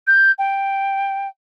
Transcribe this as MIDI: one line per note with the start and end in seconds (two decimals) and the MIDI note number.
0.07 0.32 91
0.39 1.28 79